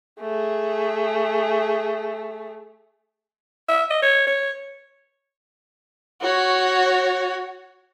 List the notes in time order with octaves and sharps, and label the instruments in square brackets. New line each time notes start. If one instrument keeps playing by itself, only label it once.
[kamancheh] A3 G#4
[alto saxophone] E5
D#5
C#5
C#5
[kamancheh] F#4 C#5